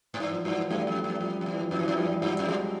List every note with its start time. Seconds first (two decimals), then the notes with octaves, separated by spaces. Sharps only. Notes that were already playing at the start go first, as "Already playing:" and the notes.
0.14 G#2
0.20 G2 E3
0.33 F3
0.45 G2 E3 F#3
0.70 F#2 G3 A3
0.87 F2
1.04 F2
1.21 F2 F3 G3
1.41 F2
1.46 E2
1.53 E3
1.62 F3
1.71 F2 E3 F#3
1.79 F#2
1.84 F2 E3 F#3
1.97 F#2 F3 G3
2.09 F3 G3
2.22 G2 F3 G3
2.39 F2
2.47 E2 F#3 G#3